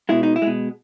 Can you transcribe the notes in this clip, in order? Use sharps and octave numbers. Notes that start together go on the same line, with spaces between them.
B2 G#3 E4
D#4
E4
B2 G#3